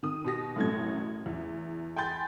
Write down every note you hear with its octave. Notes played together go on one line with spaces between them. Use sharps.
D#3 D#6
B2 G4 A#6
A1 F#2 A2 F#3 A4 G#6
E2
G5 G#5 B5 C6 G6 A6